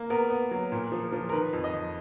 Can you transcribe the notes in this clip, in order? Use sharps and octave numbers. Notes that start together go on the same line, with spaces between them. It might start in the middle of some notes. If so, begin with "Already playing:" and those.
Already playing: A#3
B3 A#4
B3
F#3
A#2
F3
F3
A#4
D#3 B4
F2
D#5
F2